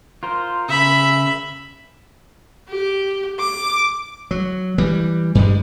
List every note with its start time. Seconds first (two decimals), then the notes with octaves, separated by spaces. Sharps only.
0.23 F4 A#4 C5
0.69 C#3 E5 B5
2.69 G4
3.39 D6
4.31 F#3
4.78 E3 G3
5.35 G2 G3 G#3